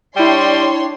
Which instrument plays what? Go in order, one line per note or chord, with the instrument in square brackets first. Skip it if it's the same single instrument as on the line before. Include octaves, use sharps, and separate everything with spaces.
[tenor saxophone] G3 [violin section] D4 C#5 C6 [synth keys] E4 G5